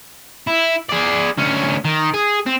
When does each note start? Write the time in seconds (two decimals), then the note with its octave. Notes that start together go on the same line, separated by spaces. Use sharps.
0.47 E4
0.89 G#4 D5
1.37 D2 C#4
1.85 D#3
2.14 G#4
2.47 C4